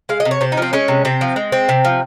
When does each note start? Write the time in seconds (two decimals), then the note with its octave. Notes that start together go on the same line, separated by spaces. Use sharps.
0.09 G#3 F5
0.20 D#5
0.25 C3
0.31 C#5
0.41 C3 C5
0.52 D#4
0.57 F3 C4
0.73 G#3 C#4
0.88 C3
1.05 C3 C4
1.21 F3
1.36 G#3
1.52 C4
1.69 C3
1.85 F3